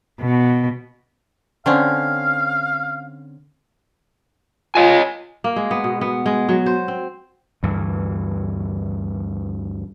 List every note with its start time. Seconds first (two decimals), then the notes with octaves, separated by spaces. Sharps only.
0.21 B2
1.66 D3 C4 C#4 F5
4.75 F4 C#5 D#5 G#5
5.44 A#3
5.56 G#3
5.71 B3
5.84 B2
6.01 B3
6.26 G#3
6.49 F#3
6.66 C5
6.88 C4
7.63 D2 G2 E3